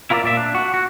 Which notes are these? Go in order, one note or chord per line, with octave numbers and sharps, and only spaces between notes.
E4 F4 A#4 C5 D5 E5
A#2 D5 E5
D4
F#4
F#4